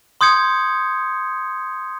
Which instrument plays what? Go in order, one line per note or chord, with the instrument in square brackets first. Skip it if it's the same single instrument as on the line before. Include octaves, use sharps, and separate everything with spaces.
[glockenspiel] C6 D#6 G6 G#6 C#7